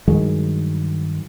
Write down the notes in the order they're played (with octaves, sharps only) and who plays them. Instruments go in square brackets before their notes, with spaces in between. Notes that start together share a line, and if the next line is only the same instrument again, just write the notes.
[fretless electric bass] G2 D#3 F#3 G#3